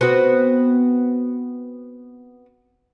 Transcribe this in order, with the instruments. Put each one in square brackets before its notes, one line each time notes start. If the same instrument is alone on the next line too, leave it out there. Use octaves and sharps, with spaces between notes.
[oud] B3 C4 F#4